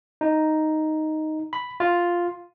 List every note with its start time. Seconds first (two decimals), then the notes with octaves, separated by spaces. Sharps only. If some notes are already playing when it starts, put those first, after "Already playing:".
0.21 D#4
1.53 B5
1.80 F4